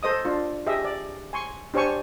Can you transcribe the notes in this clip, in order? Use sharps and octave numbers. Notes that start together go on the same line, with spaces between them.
A4 C5 D#5 D#6
D4 F4
G4 G#4 D#5 E5
D5
G#5 C6 C#6
D4 G4 C5 C#5 G#5 C#6